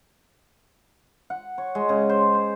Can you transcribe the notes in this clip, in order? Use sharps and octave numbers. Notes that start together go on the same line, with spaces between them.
F#5
C#5
G#3
C#3
C5
C5